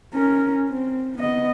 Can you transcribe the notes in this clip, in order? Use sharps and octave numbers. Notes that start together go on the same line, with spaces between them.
C#4 A#4
C4
B3 D#5